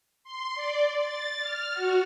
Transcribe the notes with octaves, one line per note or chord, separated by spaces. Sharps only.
C6
D5
A6
F6
F#4